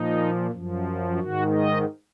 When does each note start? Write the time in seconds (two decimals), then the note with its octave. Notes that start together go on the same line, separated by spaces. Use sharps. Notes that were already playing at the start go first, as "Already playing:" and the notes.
Already playing: A#2 F3 D#4
0.51 F#2 F3
1.19 G#2 D#3 F#4
1.54 D#5